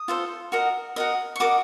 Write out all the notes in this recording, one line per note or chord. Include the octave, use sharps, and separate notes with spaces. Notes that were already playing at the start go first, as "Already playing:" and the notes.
Already playing: D#6
F4 A4 C5
F#4 A#4 D#5
F#4 A#4 D#5
C#6
F#4 A#4 D#5 D6